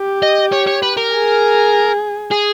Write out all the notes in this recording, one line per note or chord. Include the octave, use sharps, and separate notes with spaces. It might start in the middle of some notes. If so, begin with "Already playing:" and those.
Already playing: G4
D#5
C#5
C#5
B4
A#4
G#4
G#4